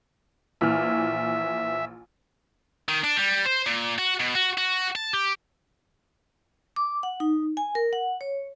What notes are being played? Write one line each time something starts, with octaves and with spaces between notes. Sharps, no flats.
A#1 E3 E5 F6
D#3
D4
G3
C5
A#2
F#4
B2
F#4
F#4
A5
G4
D6
F#5
D#4
G#5
A#4
F#5
C#5